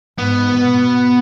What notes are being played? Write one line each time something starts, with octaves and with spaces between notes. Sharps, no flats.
G#2 B3
B2